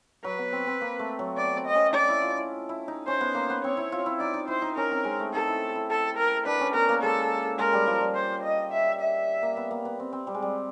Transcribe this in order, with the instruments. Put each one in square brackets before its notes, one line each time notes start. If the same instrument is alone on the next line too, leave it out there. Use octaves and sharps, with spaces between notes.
[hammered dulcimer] F#3 [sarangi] B4
[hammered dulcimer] B3
C4
C4
A#3
A3
F#3
[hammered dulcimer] B3 [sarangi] D5
[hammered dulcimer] C4
[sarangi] D#5
[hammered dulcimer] C#4
[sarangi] D5
[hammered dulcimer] E4
F4
E4
E4
D#4
[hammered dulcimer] C#4 [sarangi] C5
[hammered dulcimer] B3
A#3
B3
[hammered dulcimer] C4 [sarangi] C#5
[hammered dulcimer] E4
F4
E4
[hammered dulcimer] D#4 [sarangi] D5
[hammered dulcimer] D#4
[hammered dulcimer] E4 [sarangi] C5
[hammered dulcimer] D#4
[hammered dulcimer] C#4 [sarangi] A#4
[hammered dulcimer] C4
G#3
A3
[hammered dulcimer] D#4 [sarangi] A4
[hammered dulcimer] E4
E4
[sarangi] A4
A#4
[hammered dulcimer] D4 [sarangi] B4
[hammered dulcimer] C#4
[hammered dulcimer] B3 [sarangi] A#4
[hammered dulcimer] A#3
[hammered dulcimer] G#3 [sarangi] A4
[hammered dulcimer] G#3 [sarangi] A#4
[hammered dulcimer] G3
F3
G3
[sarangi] C5
D#5
E5
E5
[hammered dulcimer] A#3
B3
A#3
B3
C4
C4
G3
G#3
G3